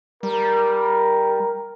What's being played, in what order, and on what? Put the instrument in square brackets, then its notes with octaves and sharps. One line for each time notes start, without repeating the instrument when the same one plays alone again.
[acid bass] G3 [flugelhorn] A#4